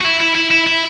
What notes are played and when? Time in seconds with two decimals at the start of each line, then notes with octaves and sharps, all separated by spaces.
0.01 F#4
0.05 E4
0.20 E4
0.35 E4
0.51 E4
0.67 E4